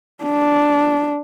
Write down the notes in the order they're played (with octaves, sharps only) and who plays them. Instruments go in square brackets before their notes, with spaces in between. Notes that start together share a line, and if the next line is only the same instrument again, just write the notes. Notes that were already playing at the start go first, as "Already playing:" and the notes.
[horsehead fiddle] D4